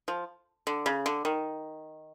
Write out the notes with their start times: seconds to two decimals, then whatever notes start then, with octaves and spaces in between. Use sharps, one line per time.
0.08 F3
0.67 D3
0.86 C#3
1.06 D3
1.25 D#3